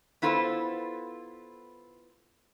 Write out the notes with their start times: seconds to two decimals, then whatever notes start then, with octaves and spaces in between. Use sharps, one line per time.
0.22 B3 E4 F4 A4 B4 C5